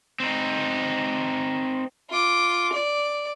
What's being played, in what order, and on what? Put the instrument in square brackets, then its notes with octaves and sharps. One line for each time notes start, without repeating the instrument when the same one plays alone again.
[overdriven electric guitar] C4 D#4
[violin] F4 D6
D5